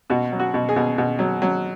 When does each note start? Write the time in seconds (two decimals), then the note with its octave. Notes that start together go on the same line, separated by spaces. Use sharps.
0.10 B2 F#4
0.32 F#3
0.39 F#4
0.54 B2
0.69 G#4
0.76 B2
0.98 B2
1.19 F#3
1.42 F#3